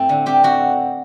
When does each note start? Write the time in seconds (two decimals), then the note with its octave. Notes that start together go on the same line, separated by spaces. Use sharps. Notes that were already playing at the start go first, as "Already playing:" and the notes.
Already playing: A2 A3 C4 A4
0.09 D3
0.26 C4 G4
0.43 C4 F#4